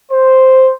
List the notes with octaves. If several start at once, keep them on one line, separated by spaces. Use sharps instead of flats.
C5